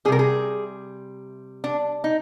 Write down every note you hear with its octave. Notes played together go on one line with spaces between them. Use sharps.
C3 G3 G#4 A#4
G#4
D4
D#4